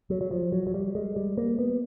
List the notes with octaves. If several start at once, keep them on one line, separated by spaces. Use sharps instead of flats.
F#3
F#3
F3
F#3
F#3
G3
G#3
G3
A#3
B3